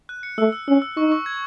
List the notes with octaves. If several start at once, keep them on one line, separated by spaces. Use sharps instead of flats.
F#6
C#7
A3 E6
E6
C#4 E6
E6
D#4 C#6
C#6
G#6